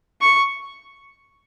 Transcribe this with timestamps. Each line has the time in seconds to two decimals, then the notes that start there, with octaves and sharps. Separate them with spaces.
0.22 C#6